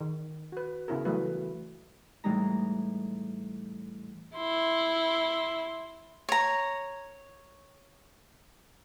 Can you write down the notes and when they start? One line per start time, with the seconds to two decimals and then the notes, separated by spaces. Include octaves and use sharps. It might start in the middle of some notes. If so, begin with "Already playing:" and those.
0.01 D#3
0.52 F#4 B4
0.88 C#3 B3 C#4 E4 G#4 A#4
1.05 E3 F#3 G3 A3 F#4 B4
2.24 A2 E3 G3 G#3 D#4 A#5
4.37 E4 C6
6.29 C#5 A#5